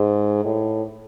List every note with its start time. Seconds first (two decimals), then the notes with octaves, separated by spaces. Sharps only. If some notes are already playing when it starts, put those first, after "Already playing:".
Already playing: G#2
0.45 A2